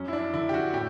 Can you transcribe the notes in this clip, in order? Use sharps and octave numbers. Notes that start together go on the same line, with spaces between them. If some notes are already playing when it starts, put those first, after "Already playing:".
Already playing: F#2 C#4
E4
D4
D3 E4
G4
F#4
A2 G4